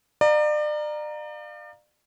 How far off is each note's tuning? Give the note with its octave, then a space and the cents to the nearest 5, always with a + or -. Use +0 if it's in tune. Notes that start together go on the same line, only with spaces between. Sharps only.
D5 +35 F5 +0 A#5 +0